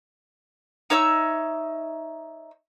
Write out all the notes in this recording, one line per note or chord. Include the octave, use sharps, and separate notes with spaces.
D#4 C#5 E5 E6